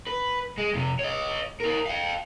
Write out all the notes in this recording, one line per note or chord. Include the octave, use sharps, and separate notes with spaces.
B4
G#3
F2 C3
C#5 D#5
G4 A#4
F5 G5